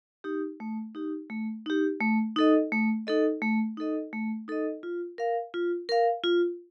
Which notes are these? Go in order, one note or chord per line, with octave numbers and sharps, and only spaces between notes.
D#4 G4
A3
D#4 G4
A3
D#4 G4
A3
D#4 A4 D#5
A3
D#4 A4 D#5
A3
D#4 A4 D#5
A3
D#4 A4 D#5
F4
A#4 F5
F4
A#4 F5
F4